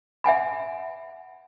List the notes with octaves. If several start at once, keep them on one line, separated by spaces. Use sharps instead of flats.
E5 F#5 G#5 B5